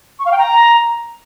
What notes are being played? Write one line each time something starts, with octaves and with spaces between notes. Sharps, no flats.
C#6
F5
G5
A#5